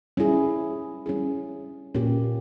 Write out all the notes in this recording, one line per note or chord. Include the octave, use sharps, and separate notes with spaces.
G3 C#4 E4 G#4
G3 C#4 E4 G#4
A#2 A#3 C#4 G4